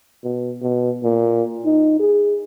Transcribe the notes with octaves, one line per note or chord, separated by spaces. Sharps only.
B2
B2
A#2
D#4
G#4